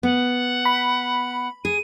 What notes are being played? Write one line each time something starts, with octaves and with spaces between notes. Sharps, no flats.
B3 F#5
B5
G#4 D#7